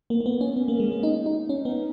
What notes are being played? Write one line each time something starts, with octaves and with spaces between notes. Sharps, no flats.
A#3
A#3
B3
C#4
B3
A#3
G#3
A#3
D#4
D#4
C#4
B3